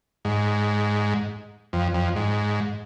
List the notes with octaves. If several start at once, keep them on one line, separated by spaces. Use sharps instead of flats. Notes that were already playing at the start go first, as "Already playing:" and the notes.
G#2
F2
F2
G#2